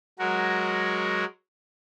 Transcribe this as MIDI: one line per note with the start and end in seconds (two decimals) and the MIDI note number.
0.19 1.25 54
0.19 1.25 56
0.19 1.25 66
0.19 1.25 70